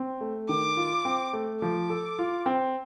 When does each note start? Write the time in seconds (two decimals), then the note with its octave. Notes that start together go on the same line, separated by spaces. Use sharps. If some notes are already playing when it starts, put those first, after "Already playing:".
Already playing: C4
0.21 A3
0.48 D#3 D6
0.77 F4
1.05 C4
1.33 A3
1.62 F3 D6
1.90 A4
2.19 F4
2.46 C4